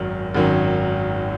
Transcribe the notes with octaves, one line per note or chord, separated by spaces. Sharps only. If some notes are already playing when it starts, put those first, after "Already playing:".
Already playing: G#1 F#2 D#3 F#3 C#4
G#1 F#2 D#3 F#3 C#4